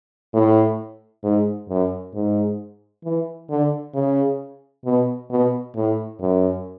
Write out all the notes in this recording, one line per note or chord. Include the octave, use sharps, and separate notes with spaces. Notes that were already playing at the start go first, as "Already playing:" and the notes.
A2
G#2
F#2
G#2
E3
D3
C#3
B2
B2
A2
F#2